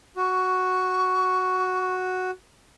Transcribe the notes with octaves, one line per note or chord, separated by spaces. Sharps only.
F#4 C#6